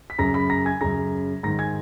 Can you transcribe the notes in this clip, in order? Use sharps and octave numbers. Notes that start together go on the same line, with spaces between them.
B6
F#2 C#3 A#5 A#6
B5 B6
A#5 A#6
G#5 G#6
F#2 C#3 A#5 A#6
G#2 D#3 A#5 A#6
G#5 G#6